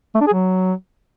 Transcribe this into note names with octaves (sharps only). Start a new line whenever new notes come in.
A3
D4
G#4
F#3